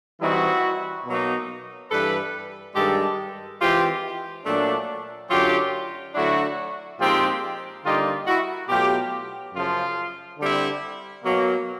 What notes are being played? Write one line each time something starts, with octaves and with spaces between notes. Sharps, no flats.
E3 G3 C4 D#4 E4 F#4
B2 F#3 A#3 D#4
G2 E3 G3 A4 B4
G2 D#3 G#3 G4 A4
E3 G#3 C4 F4 G4
A#2 F#3 A3 D4
F#2 D3 F#3 F4 G4
D3 F#3 A3 D4 E4 F#4
A#2 F3 G#3 C4 D#4 F4 G4
D3 G3 A#3 D#4 F4 G4
E4 F#4
B2 F#3 A3 F4 G4
F#2 C#3 F3 F4
D3 G3 C4 E4
B2 F#3 A#3